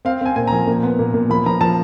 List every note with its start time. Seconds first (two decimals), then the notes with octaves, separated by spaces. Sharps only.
0.05 C4 F5
0.21 C4 G#5
0.36 A#2 G#5
0.47 A#5
0.52 F3
0.67 A#2
0.83 B3
0.99 A#2
1.14 A#2
1.29 F3 B5
1.46 F3 A#5
1.61 F3 A5